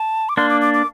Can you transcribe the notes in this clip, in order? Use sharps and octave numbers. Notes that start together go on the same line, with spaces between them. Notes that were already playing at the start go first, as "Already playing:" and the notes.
Already playing: A5
D6
A#3 D4 C6
D6
D6
D6